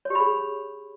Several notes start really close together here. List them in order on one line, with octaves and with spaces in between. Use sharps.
C#5 G4 B5 G#4